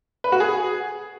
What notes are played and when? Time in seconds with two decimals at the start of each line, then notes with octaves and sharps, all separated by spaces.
0.24 B4
0.32 F#4
0.40 G#4